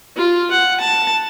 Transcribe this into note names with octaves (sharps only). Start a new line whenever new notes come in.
F4
F#5
A5